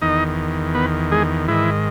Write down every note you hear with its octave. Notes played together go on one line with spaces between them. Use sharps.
E2 D#3 D#4 D#5
B3 B4
G#3 G#4
G#2 D#3 E3 E4